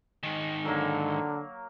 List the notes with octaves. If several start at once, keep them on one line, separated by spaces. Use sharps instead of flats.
G#2 D#3
D3 F#3 A#3